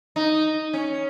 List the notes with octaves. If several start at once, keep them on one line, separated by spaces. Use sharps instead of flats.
D#4
C#4